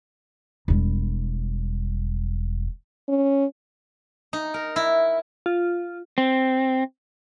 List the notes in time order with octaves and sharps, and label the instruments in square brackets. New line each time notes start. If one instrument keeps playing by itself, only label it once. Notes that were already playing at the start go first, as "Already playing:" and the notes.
[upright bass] E1 G3
[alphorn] C#4
[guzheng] D#4
A#4
E4
[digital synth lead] F4
[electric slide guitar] C4